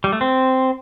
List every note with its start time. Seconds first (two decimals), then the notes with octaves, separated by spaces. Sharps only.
0.04 G3
0.12 A3
0.21 C4